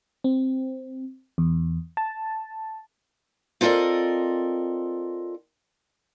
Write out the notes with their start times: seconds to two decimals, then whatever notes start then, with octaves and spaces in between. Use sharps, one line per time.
0.24 C4
1.38 E2
1.97 A5
3.61 C4 F4 A4 A#4 D5 D#5